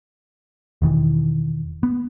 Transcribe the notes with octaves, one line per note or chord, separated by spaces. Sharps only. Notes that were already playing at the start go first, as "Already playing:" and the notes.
E1 D#3 E3
B3